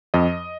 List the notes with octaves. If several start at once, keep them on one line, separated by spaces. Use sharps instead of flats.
F2 D#5